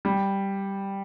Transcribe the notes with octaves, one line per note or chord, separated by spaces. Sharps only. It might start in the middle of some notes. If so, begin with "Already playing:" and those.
G3